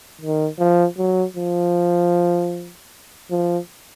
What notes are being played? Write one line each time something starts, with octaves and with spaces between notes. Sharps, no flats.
D#3
F3
F#3
F3
F3